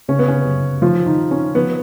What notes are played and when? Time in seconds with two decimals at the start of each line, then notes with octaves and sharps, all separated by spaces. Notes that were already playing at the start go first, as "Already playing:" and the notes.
0.08 C#3 C#4
0.19 B3
0.28 C#4
0.45 F#2
0.82 D#3 F3 F4
1.06 D#3 D#4
1.19 D#3
1.31 C#4
1.55 F3 B3